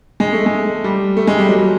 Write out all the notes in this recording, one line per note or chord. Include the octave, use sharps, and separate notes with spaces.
G#3
A3
G#3
G3
A3
G#3
G3
F#3